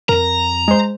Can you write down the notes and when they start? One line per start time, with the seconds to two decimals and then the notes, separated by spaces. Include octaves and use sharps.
0.09 F2 A#4 A#5
0.68 G#3 C5